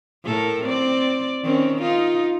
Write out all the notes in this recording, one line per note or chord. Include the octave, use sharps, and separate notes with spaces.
A2 A4 A#4
C4 D5
D#3 C4 C#4
D#4 F4